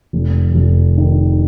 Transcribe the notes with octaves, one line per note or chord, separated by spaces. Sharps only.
F1
F1
D#3